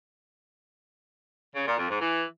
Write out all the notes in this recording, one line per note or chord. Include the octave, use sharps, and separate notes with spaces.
C#3
A#2
F2
G#2
E3